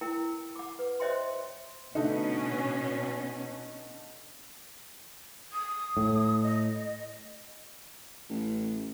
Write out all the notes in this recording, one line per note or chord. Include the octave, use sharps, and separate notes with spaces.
E4 A#4 G5
F#5 D6
B4
C5 C#5 D#5 E5 G5 C6
B2 D3 A3 C#4 D#4
D#6
A2
D#5
A1